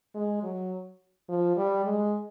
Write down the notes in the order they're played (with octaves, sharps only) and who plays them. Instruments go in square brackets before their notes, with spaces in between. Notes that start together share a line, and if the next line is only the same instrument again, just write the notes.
[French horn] G#3
F#3
F3
G3
G#3